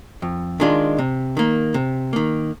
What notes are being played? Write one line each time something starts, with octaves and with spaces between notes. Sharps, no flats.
F2
D#3 G#3 D4 F4
C3
D#3 A#3
C3
D#3 A#3